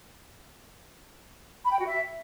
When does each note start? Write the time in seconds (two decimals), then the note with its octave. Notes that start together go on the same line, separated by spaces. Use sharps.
1.64 B5
1.71 G5
1.79 F#4
1.86 E5